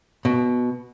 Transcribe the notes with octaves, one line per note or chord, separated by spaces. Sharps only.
B2